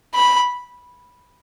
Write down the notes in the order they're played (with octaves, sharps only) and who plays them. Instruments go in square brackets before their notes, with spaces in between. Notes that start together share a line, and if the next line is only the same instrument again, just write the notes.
[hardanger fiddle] B5